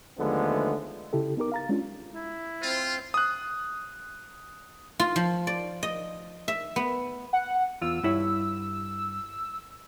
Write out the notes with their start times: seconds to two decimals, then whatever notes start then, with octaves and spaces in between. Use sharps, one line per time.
0.19 D#2 D3 F3 G#3 A3 B3
1.13 C#3 E4 G4 A4
1.37 B3 D#4 G4 A#4 D6
1.52 F5 A#5 A6
1.69 G#3 C#4 D4 F4
2.14 E4
2.62 C4 F4
3.14 D#6 F#6
5.00 F4
5.16 F3
5.47 D5
5.83 D#5
6.48 E5
6.76 B3
7.33 F#5
7.81 E2 F4 E6
8.03 G2 E4 C#5